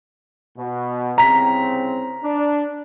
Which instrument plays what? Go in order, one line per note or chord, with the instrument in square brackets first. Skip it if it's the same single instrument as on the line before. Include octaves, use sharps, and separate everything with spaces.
[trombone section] B2
[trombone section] C2 C#3 C4 [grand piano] A#5 B6
[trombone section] D4